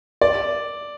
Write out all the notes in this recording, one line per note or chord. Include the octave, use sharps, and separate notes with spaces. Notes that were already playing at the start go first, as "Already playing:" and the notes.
D5